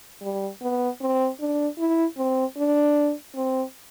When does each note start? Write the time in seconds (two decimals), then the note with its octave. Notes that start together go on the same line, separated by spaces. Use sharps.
0.22 G3
0.62 B3
1.01 C4
1.40 D4
1.78 E4
2.17 C4
2.57 D4
3.35 C4